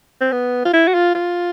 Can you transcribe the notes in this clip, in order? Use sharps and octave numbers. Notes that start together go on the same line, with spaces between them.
C4
B3
F4
E4
F#4
F4
F4